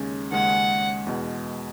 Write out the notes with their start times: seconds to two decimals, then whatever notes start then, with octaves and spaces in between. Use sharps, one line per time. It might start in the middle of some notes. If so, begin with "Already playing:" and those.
Already playing: D#2 C#3 G#3 C#4
0.32 D#2 C#3 G#3 C#4 F#5
1.07 E2 B2 G#3